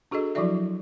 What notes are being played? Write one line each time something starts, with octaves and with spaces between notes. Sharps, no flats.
D4 F#4 G#4 A4 D#5
F3 F#3 E4 F#4 D5 E5